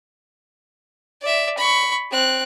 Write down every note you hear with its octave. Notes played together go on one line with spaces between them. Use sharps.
D5 E5
B5 C#6
C4 F#6